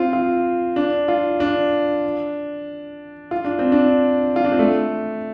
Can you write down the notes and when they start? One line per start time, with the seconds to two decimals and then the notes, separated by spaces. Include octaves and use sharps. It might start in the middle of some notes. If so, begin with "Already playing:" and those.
Already playing: C4 F4
0.13 F4
0.76 D4
1.08 F4
1.40 D4
3.31 F4
3.45 D4
3.59 C4
3.72 D4
4.36 F4
4.44 D4
4.52 C4
4.59 A3